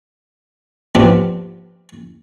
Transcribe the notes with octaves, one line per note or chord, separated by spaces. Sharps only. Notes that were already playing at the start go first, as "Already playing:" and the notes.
F3 B3 C4 D4 F4 G4